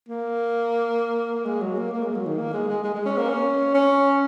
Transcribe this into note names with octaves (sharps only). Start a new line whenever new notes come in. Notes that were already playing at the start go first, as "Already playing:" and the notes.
A#3
A#3
G#3
F#3
A#3
A#3
G#3
F#3
D#3
A#3
G#3
G#3
G#3
G#3
C#4
A#3
C#4
C#4